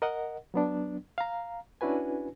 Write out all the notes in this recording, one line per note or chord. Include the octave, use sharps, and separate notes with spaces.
A#4 D#5 F#5
F#3 B3 D4
F5 A#5
C#4 D4 E4 F#4 B4 G#5